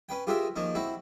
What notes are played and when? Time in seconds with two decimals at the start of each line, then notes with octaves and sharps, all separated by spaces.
0.09 C#4 B4 G5
0.27 F4 G4 G#4 A#4 C5 E5
0.56 D#3 F3 A#3 C#4
0.75 C4 E4 F#4